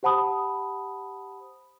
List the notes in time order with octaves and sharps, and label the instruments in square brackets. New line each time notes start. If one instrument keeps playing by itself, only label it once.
[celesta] G4 C5 F#5 A5 B5 D#6